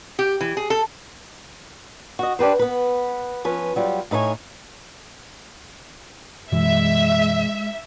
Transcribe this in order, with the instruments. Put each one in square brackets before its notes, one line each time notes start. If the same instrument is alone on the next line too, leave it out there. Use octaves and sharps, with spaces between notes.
[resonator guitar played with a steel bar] G4
E3
G#4
A4
[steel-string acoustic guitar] F#4 D#5
D4 G4 B4 C5
B3 B4
F3 C#4 B4
F#3 G3 F4
A2 D#4 B4 C#5 G#5
[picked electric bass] F#2 B2 E3 [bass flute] G#3 [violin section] E5